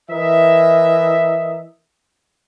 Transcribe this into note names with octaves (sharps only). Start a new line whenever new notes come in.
E3 A#4 D#5 E5